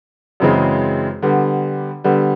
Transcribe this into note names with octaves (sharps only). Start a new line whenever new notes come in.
F#2 C#3 E3 G#3 C4
D3 G3 B3
D3 G3 B3